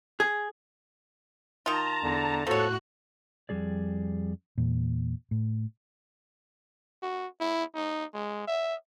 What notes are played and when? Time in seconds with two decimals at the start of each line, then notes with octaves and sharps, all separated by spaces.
0.20 G#4
1.66 D#3 F4 A5 A#5
2.03 E2 D3
2.47 A2 F3 F#4 A4 C#5 F#6
3.49 F2 G3 G#4 D5
4.58 E2 A#2
5.31 A2
7.02 F#4
7.40 E4
7.75 D#4
8.14 G#3
8.48 E5